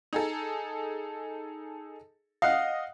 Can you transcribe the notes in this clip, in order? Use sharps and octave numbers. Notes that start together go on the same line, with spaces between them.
D#4 G#4 A4
D#5 F5 F#5